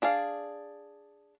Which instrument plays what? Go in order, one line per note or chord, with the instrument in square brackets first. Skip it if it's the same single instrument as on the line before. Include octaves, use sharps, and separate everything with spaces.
[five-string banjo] D4 G#4 D5 F5